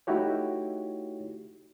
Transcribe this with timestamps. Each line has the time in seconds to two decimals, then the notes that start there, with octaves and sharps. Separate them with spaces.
0.07 A3 D#4 E4 F#4 G4 C#5